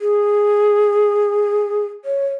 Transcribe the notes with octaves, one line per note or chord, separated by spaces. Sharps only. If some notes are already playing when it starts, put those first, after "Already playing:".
G#4
C#5